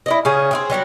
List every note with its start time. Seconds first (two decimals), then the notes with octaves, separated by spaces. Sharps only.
0.06 E4 D5 D#5
0.25 C#3 C#4 G#4
0.51 C4 F4 G#4
0.70 F#3 G3 D4 F#4